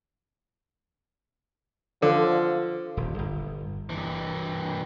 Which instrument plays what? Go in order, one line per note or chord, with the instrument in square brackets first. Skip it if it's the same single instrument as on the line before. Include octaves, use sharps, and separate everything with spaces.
[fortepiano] D3 [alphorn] F3
[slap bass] D#1
G1
[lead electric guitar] G2 E3